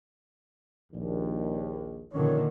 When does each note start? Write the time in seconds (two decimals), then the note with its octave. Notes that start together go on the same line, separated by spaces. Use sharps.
0.93 A#1 D#2
2.13 A#1 A#2 D3 D#3 C#4 C#5